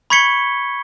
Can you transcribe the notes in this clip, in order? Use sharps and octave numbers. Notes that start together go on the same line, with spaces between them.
B5 C#6 G#6 B6 C#7 G7